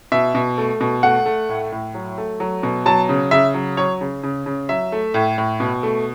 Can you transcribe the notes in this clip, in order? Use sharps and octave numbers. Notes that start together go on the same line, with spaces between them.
B2 E5
B2
A3
B2
A3 F#5
A3
A2
A2
F#3
A3
F#3
B2
F#3 A5
C#3
C#3 E5
F#3
F#3 C#5
C#3
C#3
C#3
F#3 E5
A3
A2
A2
B2
A3